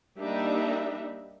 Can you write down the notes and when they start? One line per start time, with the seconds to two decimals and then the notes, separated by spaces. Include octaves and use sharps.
0.18 G3 A#3 D4 D#4 G4 E5